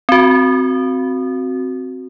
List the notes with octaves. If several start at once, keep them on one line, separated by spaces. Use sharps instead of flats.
C4 F#4